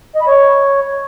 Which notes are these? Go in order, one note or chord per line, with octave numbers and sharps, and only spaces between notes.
D#5
B5
C#5